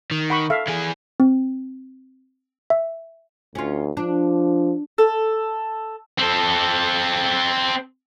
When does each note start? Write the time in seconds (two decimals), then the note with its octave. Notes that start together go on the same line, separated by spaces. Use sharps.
0.11 D#3
0.30 F#5 B5 C#6
0.50 A4 E5 F5
0.68 E3 G#4
1.20 C4
2.70 E5
3.55 D2 C#4 F4
3.97 F3 D4
4.98 A4
6.18 C4 A4